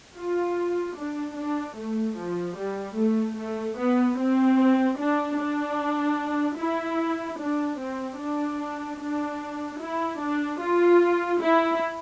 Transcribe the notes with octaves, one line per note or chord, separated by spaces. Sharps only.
F4
D4
D4
A3
F3
G3
A3
A3
B3
C4
D4
D4
E4
D4
C4
D4
D4
E4
D4
F4
E4